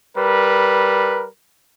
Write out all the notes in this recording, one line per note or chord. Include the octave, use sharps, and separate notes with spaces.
G3 A#4 B4